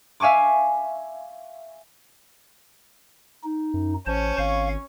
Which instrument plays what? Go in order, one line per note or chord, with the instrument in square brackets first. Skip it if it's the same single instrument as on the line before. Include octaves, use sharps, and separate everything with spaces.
[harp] E5 F5 G#5 C#6 D6
[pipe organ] D#4
[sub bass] F#2
[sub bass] A1 [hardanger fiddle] C#4 C#5 [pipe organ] C5 A5
[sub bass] G#1 [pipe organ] F5